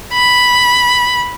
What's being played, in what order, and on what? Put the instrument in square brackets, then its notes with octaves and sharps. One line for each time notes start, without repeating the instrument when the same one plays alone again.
[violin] B5